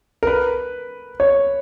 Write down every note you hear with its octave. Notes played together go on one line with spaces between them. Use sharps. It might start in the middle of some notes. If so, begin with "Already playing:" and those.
A#4
B4
C#5